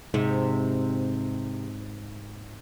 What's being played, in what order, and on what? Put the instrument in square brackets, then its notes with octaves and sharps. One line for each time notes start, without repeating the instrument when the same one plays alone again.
[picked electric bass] G#2 [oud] C3